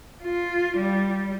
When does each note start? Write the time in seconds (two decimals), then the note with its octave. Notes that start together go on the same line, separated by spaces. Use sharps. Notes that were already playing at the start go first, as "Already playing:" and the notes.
0.23 F4
0.77 G3